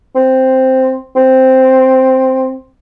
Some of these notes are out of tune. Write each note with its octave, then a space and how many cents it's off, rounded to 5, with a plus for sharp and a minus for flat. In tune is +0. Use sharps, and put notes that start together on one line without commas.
C4 +0
C4 +0